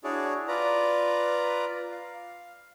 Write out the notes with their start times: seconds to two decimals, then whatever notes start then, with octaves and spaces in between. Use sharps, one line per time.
0.04 D4 E4 F#4 G#4 C#5 D5
0.48 F4 B4 D5 A#5
1.91 F5